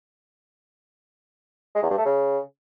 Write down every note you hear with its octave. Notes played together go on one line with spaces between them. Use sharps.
G#3
E2
G2
A3
C#3